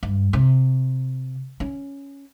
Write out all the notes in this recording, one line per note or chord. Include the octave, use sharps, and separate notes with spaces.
G2
C3
C#4